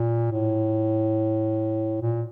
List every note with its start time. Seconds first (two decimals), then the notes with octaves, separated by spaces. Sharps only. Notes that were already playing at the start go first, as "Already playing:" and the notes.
Already playing: A#2
0.31 A2
2.01 A#2